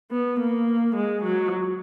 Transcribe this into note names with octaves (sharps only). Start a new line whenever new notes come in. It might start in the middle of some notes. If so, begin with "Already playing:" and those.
B3
A#3
G#3
F#3